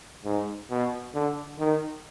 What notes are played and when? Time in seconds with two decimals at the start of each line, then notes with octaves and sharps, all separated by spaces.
0.25 G#2
0.71 B2
1.15 D3
1.59 D#3